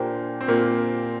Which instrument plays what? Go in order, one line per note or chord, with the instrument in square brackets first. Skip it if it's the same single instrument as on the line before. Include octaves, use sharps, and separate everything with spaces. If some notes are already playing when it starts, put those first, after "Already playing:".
Already playing: [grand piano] A#2 A#3 [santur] D4 G4 C5
[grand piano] C4
A#2 A#3